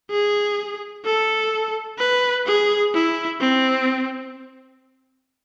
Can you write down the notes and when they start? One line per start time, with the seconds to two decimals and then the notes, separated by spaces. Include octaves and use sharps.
0.10 G#4
1.05 A4
1.99 B4
2.46 G#4
2.94 E4
3.40 C4